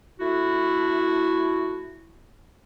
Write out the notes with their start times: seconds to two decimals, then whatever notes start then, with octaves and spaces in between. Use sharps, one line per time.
0.20 A3 E4 F#4